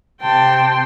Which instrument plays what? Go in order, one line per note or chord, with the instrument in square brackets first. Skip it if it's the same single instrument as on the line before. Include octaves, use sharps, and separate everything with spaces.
[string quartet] C3 G5 A5 C6